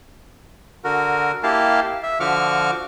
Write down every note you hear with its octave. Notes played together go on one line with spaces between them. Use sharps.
D3 F#4 A#4
A#3 E4 G4 F5 A5
E5
D3 F3 F#4 C#6 D6 F6